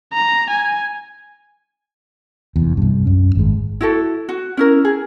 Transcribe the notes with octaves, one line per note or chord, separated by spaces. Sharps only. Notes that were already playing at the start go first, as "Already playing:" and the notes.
A#5
G#5
F1 E2
C2 G2
F#2 C#4
G#1 G#3
E4 F#4 A4
F#4
C#4 E4 A#4
G#4